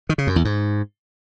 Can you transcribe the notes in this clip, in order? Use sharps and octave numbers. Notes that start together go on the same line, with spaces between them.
D#3
C#3
F#2
E2
G#2